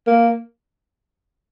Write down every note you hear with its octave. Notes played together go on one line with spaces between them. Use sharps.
A#3